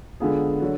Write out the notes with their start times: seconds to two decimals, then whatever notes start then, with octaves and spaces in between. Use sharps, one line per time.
0.20 D3 G#3 B3 F4 G#4
0.62 D3 F#3